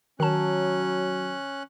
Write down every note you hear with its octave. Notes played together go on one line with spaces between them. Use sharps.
D#3 F#3 C#4 A5 F#6